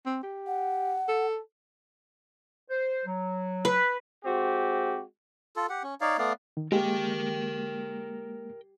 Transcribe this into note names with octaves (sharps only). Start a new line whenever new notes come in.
C4
G4
F#5
A4
C5
F#3
B4
G#3 C4 F#4 G4
F4 A4
G4 F#5
C#4
D#4 C#5 D5 F5
A3 B3 D5 F5
D#3
G#3 A#3 G4 A#4 G5